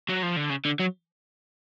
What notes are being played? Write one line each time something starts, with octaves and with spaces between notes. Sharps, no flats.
F#3
F3
D3
C#3
D3
F#3